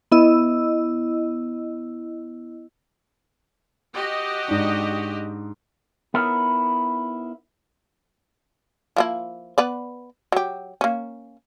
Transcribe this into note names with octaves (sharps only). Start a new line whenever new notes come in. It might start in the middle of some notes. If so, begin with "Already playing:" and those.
B3 E4 D#5 E6
F#4 G4 D#5
G#2 D4
B3 D#4 E4 A#4 B4 C#5
F3 A#3 E4
B3 B4 D5
F#3 G4
A#3 C#4